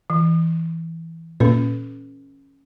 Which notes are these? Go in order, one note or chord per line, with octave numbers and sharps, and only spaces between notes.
E3
A#2 C#4 A4 B4